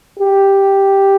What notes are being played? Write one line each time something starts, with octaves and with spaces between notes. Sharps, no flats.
G4